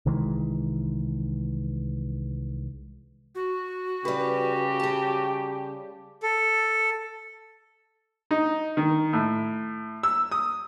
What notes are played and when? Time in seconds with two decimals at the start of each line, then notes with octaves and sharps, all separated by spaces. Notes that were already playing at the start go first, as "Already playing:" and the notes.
0.06 C2 D#3 E3 G#3
3.35 F#4
4.05 C#3 G3 G4 B4
4.80 G3 A5
6.23 A4
8.31 D#4
8.77 D#3
9.13 A2
10.03 E6
10.32 D#6